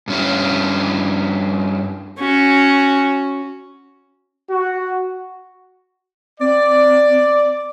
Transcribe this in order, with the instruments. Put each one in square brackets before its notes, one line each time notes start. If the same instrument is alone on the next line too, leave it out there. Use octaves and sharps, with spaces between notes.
[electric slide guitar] G2 C#4 E4
[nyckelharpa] C#4 F#4
[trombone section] F#4
[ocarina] C4 [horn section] D5